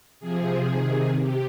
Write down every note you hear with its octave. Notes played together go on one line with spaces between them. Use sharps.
C3 F3 G#4
C3 D#3
C3 G4